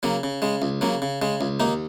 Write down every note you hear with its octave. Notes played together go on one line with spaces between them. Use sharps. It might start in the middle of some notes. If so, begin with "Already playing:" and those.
C#3 F#3 A#3
C#3
C#3 G#3
C#2
C#3 F#3 A#3
C#3
C#3 G#3
C#2
D#2 A#3 D#4